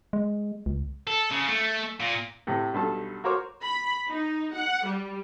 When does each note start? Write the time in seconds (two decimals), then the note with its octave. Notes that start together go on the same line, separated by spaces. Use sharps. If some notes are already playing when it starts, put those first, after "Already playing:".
0.13 G#3
0.66 C#2
1.07 A4
1.31 C#3
1.47 A3
2.00 A#2
2.47 A2 C3
2.73 B1 G2 A4 A5
3.24 F#4 A#4 C5 C#5 D6 F6
3.63 B5
4.10 D#4
4.55 F#5
4.85 G3